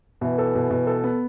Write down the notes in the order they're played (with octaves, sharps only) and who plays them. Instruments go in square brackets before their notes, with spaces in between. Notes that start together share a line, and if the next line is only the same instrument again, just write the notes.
[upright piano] B2 [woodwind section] E3
[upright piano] A4
B2
B2
A4
B3